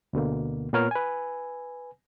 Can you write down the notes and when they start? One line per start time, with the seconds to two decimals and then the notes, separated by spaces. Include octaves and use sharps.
0.13 D2 B2 D3 A#3
0.73 A#2 B3 A#4 C#5 F6
0.91 B4 G#5